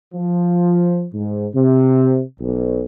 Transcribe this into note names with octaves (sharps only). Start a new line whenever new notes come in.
F3
G#2
C3
B1